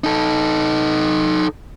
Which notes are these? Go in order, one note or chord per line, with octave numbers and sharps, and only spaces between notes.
D#4 A4